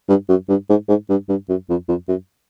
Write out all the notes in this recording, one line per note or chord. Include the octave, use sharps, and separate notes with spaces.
G2
F#2
G2
G#2
G#2
G2
G2
F#2
F2
F2
F#2